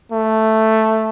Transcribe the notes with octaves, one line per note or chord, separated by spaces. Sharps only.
A3